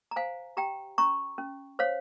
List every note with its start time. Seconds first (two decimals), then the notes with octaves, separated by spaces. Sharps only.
0.11 A#5
0.16 C5 F5 G#5
0.57 G4 G5 A#5
0.98 C#4 A#5 C#6
1.38 C#4
1.79 C5 C#5 F5